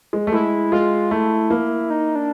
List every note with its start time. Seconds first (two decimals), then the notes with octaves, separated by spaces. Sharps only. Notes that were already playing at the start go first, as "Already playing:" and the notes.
0.13 G#3
0.27 A3
0.32 G#3 E4
0.72 G#3 F4
1.11 A3 E4
1.50 A#3
1.90 D#4
2.15 D4